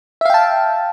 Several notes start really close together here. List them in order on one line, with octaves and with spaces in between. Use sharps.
E5 F5 G5 A5